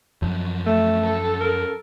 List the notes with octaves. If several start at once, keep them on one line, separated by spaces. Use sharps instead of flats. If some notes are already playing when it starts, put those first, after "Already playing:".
F#2 F3
A3
A4
A#4